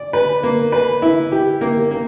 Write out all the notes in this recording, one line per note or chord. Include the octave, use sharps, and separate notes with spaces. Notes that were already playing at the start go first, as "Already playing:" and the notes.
Already playing: D5
B4
A#3
B4
E4
G4
A#3
A#3